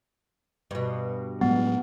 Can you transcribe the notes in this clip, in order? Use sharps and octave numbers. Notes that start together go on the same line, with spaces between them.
G2 B2
A2 F#3 G#3 B3